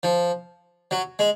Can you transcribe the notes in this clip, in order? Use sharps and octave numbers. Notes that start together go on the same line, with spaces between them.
F3
F#3
G#3